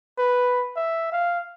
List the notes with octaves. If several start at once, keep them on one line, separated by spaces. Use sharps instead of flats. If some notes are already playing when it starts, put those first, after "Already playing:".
B4
E5
F5